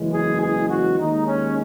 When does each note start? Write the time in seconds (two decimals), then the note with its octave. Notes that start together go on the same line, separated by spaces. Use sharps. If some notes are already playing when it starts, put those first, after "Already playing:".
Already playing: F#1 E2 C#3 E3 G#3
0.11 G#4
0.40 G#4
0.69 F#4
0.97 D#2 D#3 G#3 D#4
1.26 C#4